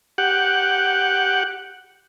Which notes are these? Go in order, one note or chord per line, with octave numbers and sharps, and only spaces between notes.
G4 F#5